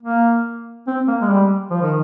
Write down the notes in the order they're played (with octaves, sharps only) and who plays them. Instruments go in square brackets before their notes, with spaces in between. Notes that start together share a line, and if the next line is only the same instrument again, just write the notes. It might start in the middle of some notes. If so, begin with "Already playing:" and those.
[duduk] A#3
C4
A#3
G#3
G3
F3
D#3